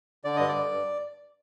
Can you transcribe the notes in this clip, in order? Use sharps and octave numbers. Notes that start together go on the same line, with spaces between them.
D3 D5
G2 D#5
D5
G2
G2